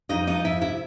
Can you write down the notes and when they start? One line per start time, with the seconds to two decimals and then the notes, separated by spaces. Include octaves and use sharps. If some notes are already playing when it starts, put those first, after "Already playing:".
0.09 F2 D#4 D#5
0.27 F3 D#4 D#5
0.44 F2 E4 E5
0.61 C3 E4 E5